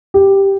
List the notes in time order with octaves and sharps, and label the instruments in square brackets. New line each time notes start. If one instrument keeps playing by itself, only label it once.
[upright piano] G4